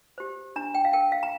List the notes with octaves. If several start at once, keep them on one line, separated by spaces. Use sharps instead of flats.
G4 C5
D4 A#5
G5
F5
A#4 G5
F5
A#5